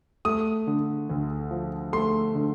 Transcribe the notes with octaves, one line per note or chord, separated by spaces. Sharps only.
A3 D#6
D3
D2
F3
A3 C6
D3